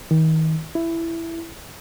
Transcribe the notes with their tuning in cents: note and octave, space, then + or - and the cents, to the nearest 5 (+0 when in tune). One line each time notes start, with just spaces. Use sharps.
D#3 +35
E4 +10